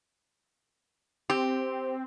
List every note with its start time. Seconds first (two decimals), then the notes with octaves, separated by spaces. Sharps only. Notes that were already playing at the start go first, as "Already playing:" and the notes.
1.30 C4 G4